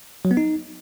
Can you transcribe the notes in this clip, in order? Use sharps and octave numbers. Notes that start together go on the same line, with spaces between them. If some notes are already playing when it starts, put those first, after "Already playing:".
F#3
B3
D#4